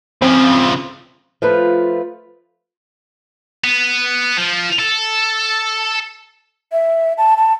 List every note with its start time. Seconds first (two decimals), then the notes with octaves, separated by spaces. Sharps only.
0.22 C#3 F3 C4
1.42 F3 A3 F4 B4
3.64 B3
4.38 F3
4.79 A4
6.72 E5
7.18 A5
7.37 A5